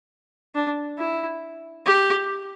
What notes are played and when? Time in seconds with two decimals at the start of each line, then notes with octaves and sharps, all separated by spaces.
0.55 D4
0.98 E4
1.86 G4